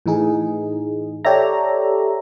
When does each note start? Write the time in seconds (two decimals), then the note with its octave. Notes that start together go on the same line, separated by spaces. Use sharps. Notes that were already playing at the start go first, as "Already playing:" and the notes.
0.06 A2 E3 D#4 G#4
1.25 G4 A4 C#5 D5 E5 A#5